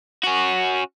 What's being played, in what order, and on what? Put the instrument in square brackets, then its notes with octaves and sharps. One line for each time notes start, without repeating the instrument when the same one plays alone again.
[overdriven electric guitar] C#4 F#4